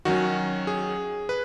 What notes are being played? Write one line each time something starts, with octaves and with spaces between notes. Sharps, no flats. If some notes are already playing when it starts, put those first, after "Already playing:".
D#3 F#3 C#4 F#4
G#4
B4